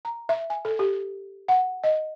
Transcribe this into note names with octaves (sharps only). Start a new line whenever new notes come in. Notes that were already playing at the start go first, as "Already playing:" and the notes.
A#5
E5
G#5
A4
G4
F#5
D#5